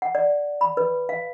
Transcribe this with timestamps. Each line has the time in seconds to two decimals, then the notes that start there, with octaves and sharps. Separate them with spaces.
0.02 F#5
0.15 D5
0.61 B5
0.77 B4
1.09 F5